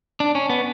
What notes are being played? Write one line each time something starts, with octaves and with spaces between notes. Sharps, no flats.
D4
C#4
B3